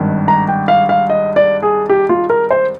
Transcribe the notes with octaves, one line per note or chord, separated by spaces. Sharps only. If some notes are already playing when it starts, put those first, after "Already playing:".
Already playing: G#1 G2 D#3
A#5
G5
F5
F5
D#5
D5
G#4
G4
F4
A#4
C5